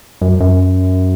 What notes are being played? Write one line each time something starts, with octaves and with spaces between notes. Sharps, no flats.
F#2
F#2